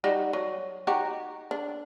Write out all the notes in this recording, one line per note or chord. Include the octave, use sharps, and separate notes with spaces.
G3 D#4 F#4
F#3
D#4 F#4 G4
D4